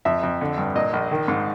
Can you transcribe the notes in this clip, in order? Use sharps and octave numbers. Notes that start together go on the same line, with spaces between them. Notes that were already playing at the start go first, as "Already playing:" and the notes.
F2 E5
F2
D3
G2
A#2 D#5
A#1
D#3
G#2